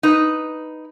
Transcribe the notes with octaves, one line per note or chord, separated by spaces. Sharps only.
D#4 B4